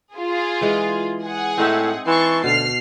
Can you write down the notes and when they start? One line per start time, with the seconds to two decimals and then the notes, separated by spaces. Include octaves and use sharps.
0.14 F4 G#4
0.61 E3 G#3
1.23 G#4 F#5
1.58 A2 C4 D#4 E5
2.06 E3 A5 C6 C#6
2.44 D2 B2 F6 C7